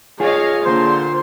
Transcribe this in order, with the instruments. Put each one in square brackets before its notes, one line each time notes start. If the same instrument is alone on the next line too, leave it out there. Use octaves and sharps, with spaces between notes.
[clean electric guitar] F4 G#4 [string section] C#5 D#5 F5
[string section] A#2 D3 C6 [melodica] C5